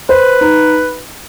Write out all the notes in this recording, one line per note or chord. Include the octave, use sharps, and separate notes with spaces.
B4 C5
D#4